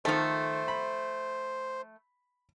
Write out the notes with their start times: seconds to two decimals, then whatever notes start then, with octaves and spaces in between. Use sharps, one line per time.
0.05 D#3 F3 A3 A4 C5
0.68 B5